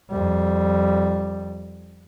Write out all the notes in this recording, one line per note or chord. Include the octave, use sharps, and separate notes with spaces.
F2 G3